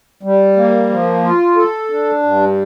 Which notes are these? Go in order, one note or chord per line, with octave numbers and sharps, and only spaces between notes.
G3
A#3
F3
F4
A4
D4
G2